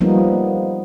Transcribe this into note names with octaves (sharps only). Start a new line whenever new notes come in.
F3 G3 A#3 B3 D#4